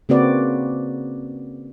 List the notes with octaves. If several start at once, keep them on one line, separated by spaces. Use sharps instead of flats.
C#3 A#3 C4 F#4 B4 D5